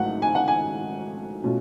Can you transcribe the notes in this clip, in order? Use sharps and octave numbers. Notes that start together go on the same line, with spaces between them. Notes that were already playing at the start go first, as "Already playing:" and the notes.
Already playing: G#1 G#2 F#3 A3 F#5
G#5
F#5
G#5
B2 A3 C#4 F4